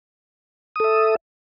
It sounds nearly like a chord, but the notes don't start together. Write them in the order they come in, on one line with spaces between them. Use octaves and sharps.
D#6 A4 E5